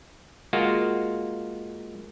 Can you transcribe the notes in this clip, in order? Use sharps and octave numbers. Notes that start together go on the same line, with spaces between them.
G#3 A#3 F4 F#4